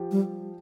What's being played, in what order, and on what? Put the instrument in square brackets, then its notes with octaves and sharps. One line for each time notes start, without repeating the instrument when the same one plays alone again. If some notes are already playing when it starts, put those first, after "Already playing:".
Already playing: [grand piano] F3 G4
[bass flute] G3